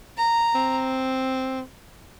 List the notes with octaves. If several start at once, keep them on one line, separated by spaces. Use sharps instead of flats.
A#5
C4